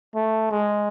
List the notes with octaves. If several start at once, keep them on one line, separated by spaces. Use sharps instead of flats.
A3
G#3